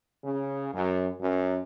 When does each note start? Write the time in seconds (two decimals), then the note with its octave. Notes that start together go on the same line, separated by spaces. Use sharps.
0.23 C#3
0.72 F#2
1.20 F#2